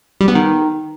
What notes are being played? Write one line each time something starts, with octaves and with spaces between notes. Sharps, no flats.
G3
B3
D#3